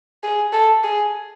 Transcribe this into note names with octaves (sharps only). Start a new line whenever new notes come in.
G#4
A4
G#4